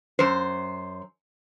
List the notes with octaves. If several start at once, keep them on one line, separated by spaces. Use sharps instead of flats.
F#2 C5